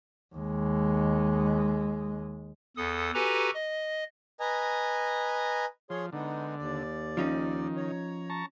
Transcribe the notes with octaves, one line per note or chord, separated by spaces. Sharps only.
D#2 G#3
E2 A4 D#6
F#4 G4 A4 B4 G#5 A#5
D#5
B4 D#5 G#5 A#5
F3 G#4 C#5 C6
D3 G#3 B3 D#4
D#2 D5
D#3 F3 C#4 D#4
C#5 A#5
A5 A#5 C#6